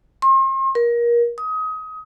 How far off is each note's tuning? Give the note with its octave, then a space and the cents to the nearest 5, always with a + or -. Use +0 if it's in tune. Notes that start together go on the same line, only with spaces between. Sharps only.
C6 +40
A#4 +25
D#6 +25